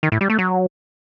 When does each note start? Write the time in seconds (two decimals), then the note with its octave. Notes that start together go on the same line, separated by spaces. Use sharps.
0.03 D#3
0.12 A2
0.21 G3
0.30 A3
0.39 F#3